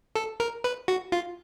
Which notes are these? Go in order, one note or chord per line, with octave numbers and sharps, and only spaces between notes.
A4
A#4
B4
F#4
F4